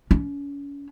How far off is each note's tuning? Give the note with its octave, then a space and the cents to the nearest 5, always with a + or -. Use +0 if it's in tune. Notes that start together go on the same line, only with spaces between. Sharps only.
C#4 +35